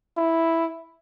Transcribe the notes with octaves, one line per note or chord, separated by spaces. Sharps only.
E4